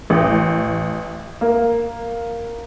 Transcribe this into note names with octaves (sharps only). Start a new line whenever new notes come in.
A1
A#3